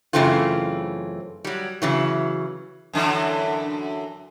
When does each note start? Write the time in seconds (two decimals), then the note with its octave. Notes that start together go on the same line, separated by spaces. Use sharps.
0.13 F#2 C#3 E3 A3 C4 F4
1.44 F#3 G3
1.82 C#3 E3 F#3
2.93 F#2 D3 E3